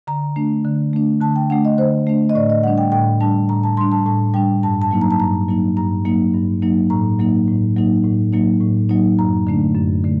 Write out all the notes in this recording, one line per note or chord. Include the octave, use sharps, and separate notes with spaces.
D3 A#5
A3 D4
D3
A3 D4
D3 A5
G5
A3 D4 F#5
D#5
D3 C5
A3 D4
D#5
A2 D5
D#5
G3 D4 F#5
G5
A2 G5
G3 D4 A5
A2 A#5
A5
G3 D4 C6
A5
A2 A5
G3 D4 G5
G2 A5
A5
F#3 A#3 D#4
A#5
A5
G2 A#5
F#3 A#3 D#4
G2 A#5
F#3 A#3 D#4
G2
F#3 A#3 D#4
A2 A#5
F#3 A#3 D#4
A2
F#3 A#3 D#4
A2
F#3 A#3 D#4
A2
F#3 A#3 D#4
F#2 A#5
D3 A3 D4
F#2
D3 A3